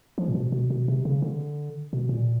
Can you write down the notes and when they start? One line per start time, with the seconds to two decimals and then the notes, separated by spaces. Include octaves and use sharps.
0.18 F3
0.28 A#2
0.35 B2
0.52 B2
0.70 B2
0.88 C3
1.05 C#3
1.22 D3
1.93 B2
2.09 A#2